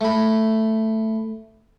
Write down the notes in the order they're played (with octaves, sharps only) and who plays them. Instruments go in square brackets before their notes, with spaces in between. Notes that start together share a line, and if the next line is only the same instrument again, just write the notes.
[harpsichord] A3 B5